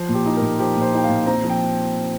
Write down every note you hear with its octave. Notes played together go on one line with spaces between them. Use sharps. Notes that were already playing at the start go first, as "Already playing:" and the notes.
Already playing: F3 C5
A#2
G4
D#4
A#2 A#4
F3 G4
A#2
C5
D#4 G5
F5
A#2
C4 A#5
F3
G5